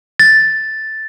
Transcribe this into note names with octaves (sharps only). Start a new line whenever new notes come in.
A6